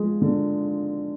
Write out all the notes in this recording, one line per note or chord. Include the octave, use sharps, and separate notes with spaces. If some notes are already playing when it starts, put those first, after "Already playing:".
Already playing: F3 G#3
D3